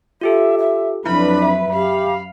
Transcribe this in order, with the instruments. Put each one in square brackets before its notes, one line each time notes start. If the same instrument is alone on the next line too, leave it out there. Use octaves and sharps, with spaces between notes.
[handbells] F4 G4 A4 [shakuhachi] E5
[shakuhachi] E5
[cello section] F2 F#3 B4 [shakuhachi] D4 [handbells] E4 [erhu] B5
[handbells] E5
[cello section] F#2 F5 [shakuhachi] G4 [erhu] B5